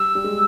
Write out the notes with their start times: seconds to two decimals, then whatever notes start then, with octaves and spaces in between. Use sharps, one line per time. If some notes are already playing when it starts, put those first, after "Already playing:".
Already playing: G3 E6
0.15 G3
0.24 G#3